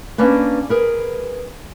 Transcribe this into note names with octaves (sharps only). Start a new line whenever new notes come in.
A#3 C#4 D4 B4
G#4 A#4 B4